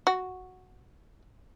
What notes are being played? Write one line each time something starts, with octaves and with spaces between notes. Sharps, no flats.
F#4